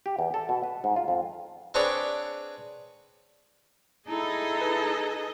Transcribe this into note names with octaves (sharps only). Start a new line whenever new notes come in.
G4
E2
A4
B2
B4
G#2
F4
F2
C4 D4 G#4 B4 C#5 D5
D#4 E4 G#4 A4 D#5
B4